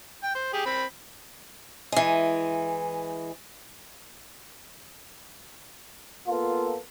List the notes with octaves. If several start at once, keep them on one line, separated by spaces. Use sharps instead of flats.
G5
C5
G4 G#4
C4 B5
E3 G#3
A#3 B3 F4 A4